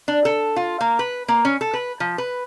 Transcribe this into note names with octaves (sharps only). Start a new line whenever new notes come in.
D4
A4
F4
A#3
B4
A#3
C#4
A4
B4
F3
B4